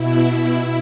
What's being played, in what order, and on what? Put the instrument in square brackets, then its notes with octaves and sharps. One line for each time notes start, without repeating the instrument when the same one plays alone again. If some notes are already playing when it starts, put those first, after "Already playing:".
Already playing: [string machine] B2 E4
E4